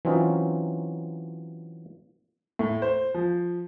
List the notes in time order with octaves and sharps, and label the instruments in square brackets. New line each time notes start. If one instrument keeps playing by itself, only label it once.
[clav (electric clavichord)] E3 F#3 C4 C#4 D#4 F4
[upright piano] A2
C5
F3